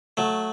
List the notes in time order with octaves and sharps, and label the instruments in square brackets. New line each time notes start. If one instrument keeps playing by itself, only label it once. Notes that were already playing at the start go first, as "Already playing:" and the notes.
[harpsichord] F#3 A3